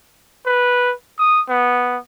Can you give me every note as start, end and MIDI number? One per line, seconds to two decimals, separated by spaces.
0.46 0.93 71
1.19 1.41 87
1.49 1.97 59